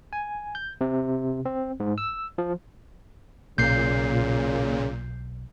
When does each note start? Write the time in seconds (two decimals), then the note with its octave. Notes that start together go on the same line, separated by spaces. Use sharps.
0.13 G#5
0.55 G6
0.81 C3
1.45 C4
1.80 G#2
1.98 E6
2.38 F3
3.58 B1 A#2 C#3 G6 C7